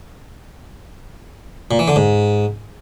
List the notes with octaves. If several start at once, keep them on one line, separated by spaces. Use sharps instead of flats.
A#2
E3
D3
G#2